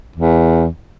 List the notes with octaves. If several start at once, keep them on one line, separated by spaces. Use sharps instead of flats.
E2